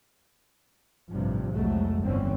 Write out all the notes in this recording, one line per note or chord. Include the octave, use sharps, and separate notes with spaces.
A1 G2 C3 F3
C2 F2 F#3 G#3 A3
G1 F2 D3 E3 C4 C#4